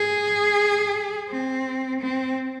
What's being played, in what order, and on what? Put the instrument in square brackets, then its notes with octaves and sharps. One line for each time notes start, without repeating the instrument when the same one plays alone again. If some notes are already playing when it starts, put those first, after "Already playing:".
Already playing: [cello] G#4
C4
C4